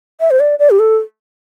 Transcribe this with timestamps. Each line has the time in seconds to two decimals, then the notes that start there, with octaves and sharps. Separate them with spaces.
0.20 E5
0.31 C5
0.40 D5
0.59 D5
0.70 G4
0.79 A4